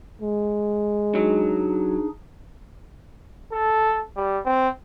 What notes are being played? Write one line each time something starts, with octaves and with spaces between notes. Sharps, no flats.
G#3
F#3 D4 D#4 G#4
A4
G3
C4